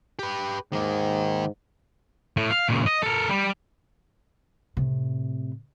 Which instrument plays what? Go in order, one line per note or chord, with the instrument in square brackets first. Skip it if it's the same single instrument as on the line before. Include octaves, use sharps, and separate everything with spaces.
[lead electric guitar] G4 B4
[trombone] G#2 [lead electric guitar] D#3 A#3
[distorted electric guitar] A2
F5
A#2 C#3
D#5
A4 A#4
G3
[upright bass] A2 C3